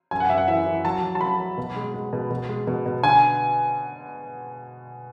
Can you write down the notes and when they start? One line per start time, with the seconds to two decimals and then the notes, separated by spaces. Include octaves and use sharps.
0.11 F#2 G#5
0.20 F#5
0.29 F#2 E5
0.38 F#5
0.48 E3 E5
0.66 E3
0.85 F#3 A5
1.03 F#3
1.15 A5
1.21 F#3 B5
1.39 F#3
1.58 B2
1.76 G#3
1.94 G#3
2.13 B2
2.31 B2
2.49 G#3
2.67 B2
2.86 B2
3.04 D3 G#5